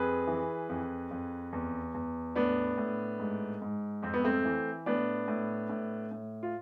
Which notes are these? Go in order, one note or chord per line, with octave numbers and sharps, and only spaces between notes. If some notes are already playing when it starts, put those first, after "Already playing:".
Already playing: F2 G#4 B4
E3
F2
F2
E2
E2
A2 B3 D4
A2
G#2
G#2
F2 C4
B3
A3 C4
E3
A2 B3 D4
A2
A2
A2
F4